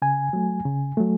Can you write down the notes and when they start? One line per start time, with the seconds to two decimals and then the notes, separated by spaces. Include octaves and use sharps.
0.02 C#3 G#5
0.33 F#3 A3
0.65 C#3
0.97 F#3 A3